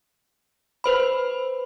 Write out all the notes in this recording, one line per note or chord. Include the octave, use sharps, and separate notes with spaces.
B4 C5 B5